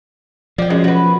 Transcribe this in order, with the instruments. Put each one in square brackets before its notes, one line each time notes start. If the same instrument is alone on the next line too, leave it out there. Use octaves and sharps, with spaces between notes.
[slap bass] F3 [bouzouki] D5 G5
[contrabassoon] F#2 [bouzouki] G#3
[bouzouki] F#4 B4
[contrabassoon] B2